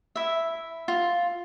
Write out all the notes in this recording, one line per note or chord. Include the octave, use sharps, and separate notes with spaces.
E4 E5
F4